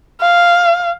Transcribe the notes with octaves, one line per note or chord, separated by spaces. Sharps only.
F5